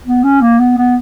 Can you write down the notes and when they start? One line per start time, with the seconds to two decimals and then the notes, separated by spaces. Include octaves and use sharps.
0.06 B3
0.24 C#4
0.42 A#3
0.59 B3
0.77 B3